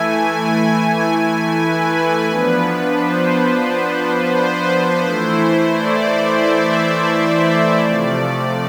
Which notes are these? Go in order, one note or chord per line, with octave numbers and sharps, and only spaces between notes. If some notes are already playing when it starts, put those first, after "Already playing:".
Already playing: E3 A3 E4 G#5
B4
F3 B3 D4
C5
C5
E3 A3 E4
D5
E5
C5
C3 F3 A3 D5